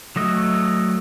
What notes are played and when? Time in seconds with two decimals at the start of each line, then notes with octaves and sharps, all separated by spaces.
0.16 F#3 A3 D#5